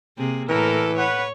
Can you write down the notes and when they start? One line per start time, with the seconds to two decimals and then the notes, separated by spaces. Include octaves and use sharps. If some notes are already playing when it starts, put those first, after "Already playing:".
0.17 C3 A#3 G#4
0.49 A2 E3 A4 A#4
0.97 B4 C#5 F#5